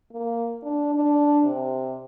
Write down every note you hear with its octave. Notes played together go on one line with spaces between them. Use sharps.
A#3
D4
D4
C3